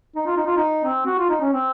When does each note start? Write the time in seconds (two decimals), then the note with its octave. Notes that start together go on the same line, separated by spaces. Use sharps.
0.16 D#4
0.27 F4
0.37 D#4
0.46 F4
0.57 D#4
0.85 C4
1.07 F#4
1.18 F4
1.29 D#4
1.41 C#4
1.53 C4